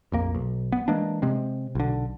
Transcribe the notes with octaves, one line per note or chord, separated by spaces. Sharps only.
A#1 F2 A#3
B1
B3
E3 G#3 A#3 D4
C3 G#3 C4
B1 D3